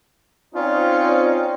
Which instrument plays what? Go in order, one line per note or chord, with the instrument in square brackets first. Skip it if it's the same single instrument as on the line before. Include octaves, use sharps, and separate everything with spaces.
[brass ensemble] C4 C#4 D#4 [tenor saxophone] F4 [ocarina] D5